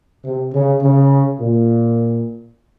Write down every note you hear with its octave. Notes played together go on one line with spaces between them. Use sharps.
C3
C#3
C#3
A#2